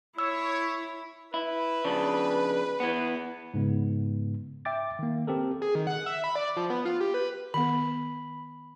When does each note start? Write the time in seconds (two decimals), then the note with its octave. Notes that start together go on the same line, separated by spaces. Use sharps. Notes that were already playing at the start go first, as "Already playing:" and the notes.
0.18 E4 C#5 E6
1.34 E4 B4
1.85 C#3 F3 D4
2.80 E3 B3
3.54 G#2 C#3 B3
4.65 E5 G5 D6 A6
4.99 D#3 A#3
5.27 C4 G4 A4 A#4
5.62 G#4
5.75 D#3
5.87 F#5
6.06 E5
6.24 B5
6.35 D5
6.57 F3
6.70 B3
6.85 F4
7.01 G4
7.14 B4
7.54 D#3 B3 B5